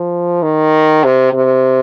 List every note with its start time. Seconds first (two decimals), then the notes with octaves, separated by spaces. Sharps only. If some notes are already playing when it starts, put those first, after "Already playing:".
Already playing: F3
0.43 D#3
1.04 C3
1.33 C3